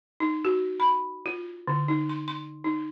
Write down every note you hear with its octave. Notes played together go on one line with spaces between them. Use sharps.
D#4
F#4
B5
F4
D3
D#4
C6
C6
D#4